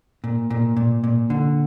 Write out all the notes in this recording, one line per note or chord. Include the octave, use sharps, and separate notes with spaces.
A#2
A#2
A#2
A#2
D3